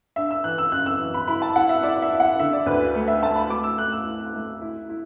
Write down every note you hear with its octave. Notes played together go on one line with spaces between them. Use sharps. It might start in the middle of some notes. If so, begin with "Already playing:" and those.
D4 E5
E6
E3 F#6
E6
F#2 F#6
E6
E3
B5
E4 B5
A5
E4 F#5
E5
E4 D5
E5
E4
F#5
D3 E5
D5
D2 B4
A3 B4
E5
A3 A5
B5
A3 D6
E6
A3 F#6
E6
E4
A3
E4
E4